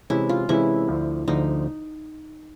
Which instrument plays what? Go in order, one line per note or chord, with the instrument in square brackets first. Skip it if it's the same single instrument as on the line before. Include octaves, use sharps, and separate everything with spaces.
[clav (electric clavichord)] C3 E3 G#3 C#4 [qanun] E4
[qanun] F4
[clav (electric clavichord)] C3 E3 G#3 C#4 [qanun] E4
[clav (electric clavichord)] D2 D3 F3
[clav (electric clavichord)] D2 D3 F3 [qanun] D#4